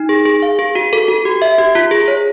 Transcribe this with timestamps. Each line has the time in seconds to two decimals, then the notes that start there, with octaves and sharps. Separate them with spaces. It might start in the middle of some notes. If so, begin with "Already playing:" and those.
Already playing: D#4
0.09 G#4
0.26 G#4
0.42 F5
0.59 G#4
0.75 F#4
0.93 A4
1.08 F#4
1.25 G4
1.42 E5
1.58 G4
1.75 F4
1.91 G#4
2.08 C#5